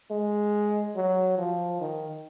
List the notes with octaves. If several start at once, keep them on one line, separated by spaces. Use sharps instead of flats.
G#3
F#3
F3
D#3